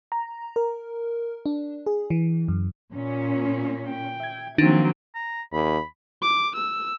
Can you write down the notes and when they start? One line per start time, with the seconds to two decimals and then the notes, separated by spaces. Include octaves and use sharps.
0.12 A#5
0.56 A#4
1.46 D4
1.86 G#4
2.10 E3
2.48 F#2
2.93 A#2 C#4
3.89 G5
4.20 E5 G#6
4.58 D#3 F3 F#3 A#3 C4 D4 D#4
5.15 A#5
5.53 D#2 B5
6.22 D6
6.55 E6